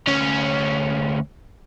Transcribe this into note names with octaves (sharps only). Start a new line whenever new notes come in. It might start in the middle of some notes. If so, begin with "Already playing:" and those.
D2 C#4